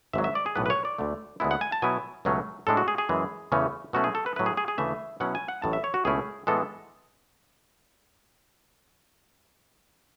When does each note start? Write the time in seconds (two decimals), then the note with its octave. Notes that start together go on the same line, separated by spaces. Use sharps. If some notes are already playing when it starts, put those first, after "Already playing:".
0.13 G#1 G#2 F#3 E5
0.24 E5
0.35 D5
0.46 G#4
0.56 B1 A2 E3 B3 B4
0.66 B4
0.70 C#5
0.85 D5
0.98 D2 D3 A3
1.40 D2 D3 G#3 B3 E4
1.51 F#5
1.61 G#5
1.72 A5
1.82 B2 F#3 B3 E4 G#5
2.25 C#2 B2 F#3 A3 C#4
2.67 A2 G#3 D4 A4
2.77 F#4
2.88 G#4
2.98 G#4
3.09 F#2 E3 G#3
3.52 E2 C#3 E3 A3 C#4
3.93 B2 F#3 A3 C#4 E4 F#4
4.04 G#4
4.15 A4
4.26 B4
4.36 A2 F#3 B3 E4 B4
4.46 G#4
4.57 G#4
4.68 G#4
4.78 D2 C#3 E3 A3 E5
5.20 B2 F#3 C#4 E4 F#5
5.35 G#5
5.48 F#5
5.62 A1 A2 F#3 A5
5.73 E5
5.84 C#5
5.94 F#4
6.05 C#2 B2 A3 C#4 E4 G#4
6.47 A2 E3 G#3 B3 A4